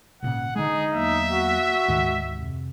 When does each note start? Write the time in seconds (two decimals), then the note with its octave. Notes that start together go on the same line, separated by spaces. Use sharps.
0.23 G#1 A#2 C#3 F#5
0.56 D3 G#3 D#4 G#4
0.93 E2 F#3 A#3 E5
1.30 F#4
1.88 D2 G#2 D#3 G#3
2.34 F2 C3